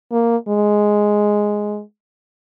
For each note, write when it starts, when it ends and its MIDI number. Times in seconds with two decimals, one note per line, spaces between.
0.12 0.37 58
0.48 1.82 56